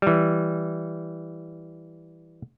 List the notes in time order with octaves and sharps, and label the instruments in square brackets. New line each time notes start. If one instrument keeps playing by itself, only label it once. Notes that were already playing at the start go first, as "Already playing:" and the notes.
[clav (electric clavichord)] E3 G3